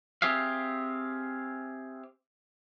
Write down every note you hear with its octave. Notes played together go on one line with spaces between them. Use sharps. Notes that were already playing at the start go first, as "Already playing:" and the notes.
C4 G4 G#4 E5 F5